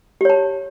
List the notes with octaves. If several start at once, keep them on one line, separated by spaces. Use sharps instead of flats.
G4 C#5 A5